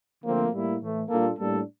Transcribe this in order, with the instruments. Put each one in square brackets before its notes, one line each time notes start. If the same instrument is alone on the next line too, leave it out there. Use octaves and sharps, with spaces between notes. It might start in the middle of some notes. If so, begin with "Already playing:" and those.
[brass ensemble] D3 F3 A3 C4 [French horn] A#3
[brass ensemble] A2 G3 A#3 E4
A2 E3 A3
[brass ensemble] A#2 G3 D4 F4 A4 [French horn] A#3
[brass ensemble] A2 G3 A#3 D4 A4